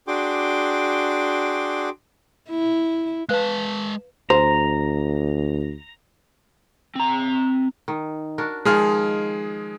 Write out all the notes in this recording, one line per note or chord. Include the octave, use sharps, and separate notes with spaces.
D4 F#4 G#4 G5 C6 D6
E4
G#3 B4 F5 A5 F#6
D2 C5 A#5
C4 A#5
D#3
D4 F#4 A#4
D#3 F3 G#3 G#4 D5 F6